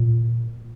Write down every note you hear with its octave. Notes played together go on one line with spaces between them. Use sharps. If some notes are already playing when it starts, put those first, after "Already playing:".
Already playing: A#2